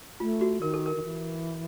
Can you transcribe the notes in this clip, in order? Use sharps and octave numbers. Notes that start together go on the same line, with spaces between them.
A3 F4
F#4
D#3 A#4
A4
A#4
D#3
E3